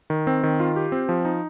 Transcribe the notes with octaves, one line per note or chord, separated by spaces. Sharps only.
D#3
C4
D#3
F4
G4
C4
F3
D#4